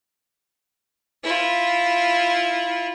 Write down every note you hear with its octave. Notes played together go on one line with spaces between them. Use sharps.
E4 F4